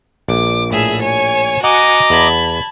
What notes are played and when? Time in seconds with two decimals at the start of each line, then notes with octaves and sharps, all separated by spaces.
0.29 A#1 D6
0.70 A2 G#4 E5
1.02 C#5 G#5
1.64 F#4 D#5 F#5 G#5 A#5 D6
2.10 E2 A5 B5 G#6